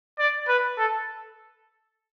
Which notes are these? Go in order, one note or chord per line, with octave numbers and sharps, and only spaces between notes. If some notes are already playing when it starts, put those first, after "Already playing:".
D5
B4
A4